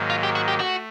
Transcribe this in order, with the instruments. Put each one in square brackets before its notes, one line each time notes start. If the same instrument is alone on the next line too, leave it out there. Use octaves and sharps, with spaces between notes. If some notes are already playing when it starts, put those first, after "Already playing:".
Already playing: [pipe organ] G#2 D#3 F#3 A#3
[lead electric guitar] F4
G4
F#4
G4
[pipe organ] A3 [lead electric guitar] F#4